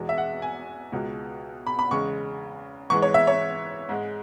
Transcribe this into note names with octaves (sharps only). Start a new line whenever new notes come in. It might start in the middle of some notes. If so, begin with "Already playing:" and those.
Already playing: E2 B2 G#3
E5
F#5
G#5
C#2 B2 G#3
B5
B5
E2 C#3 G#3 C#6
G#2 E3 G#3 C#6
C#5
E5
C#5
G#2 G#3